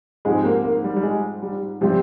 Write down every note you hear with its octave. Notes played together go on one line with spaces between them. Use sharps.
G#2 F3 G#3 C4 G4
A#3
A#3
G3
G3
G#3
G3
C3 F3 G3 C4 G4